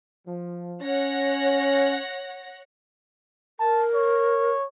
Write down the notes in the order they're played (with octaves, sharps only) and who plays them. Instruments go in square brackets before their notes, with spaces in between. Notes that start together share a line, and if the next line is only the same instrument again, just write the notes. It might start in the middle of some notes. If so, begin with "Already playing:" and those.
[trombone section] F3
[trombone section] C#4 [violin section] C#5 F#5 A#6
[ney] A#4 [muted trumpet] A5
[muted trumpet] C#5